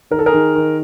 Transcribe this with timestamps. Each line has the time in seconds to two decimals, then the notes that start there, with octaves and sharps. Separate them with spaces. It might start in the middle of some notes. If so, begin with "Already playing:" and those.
0.11 D#3 A#4
0.19 A4
0.26 G#4 A#4
0.33 D#3
0.55 D#3